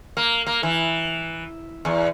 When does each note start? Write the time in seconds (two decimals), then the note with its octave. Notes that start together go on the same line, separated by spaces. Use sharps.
0.17 A#3
0.46 A#3
0.63 E3
1.85 E2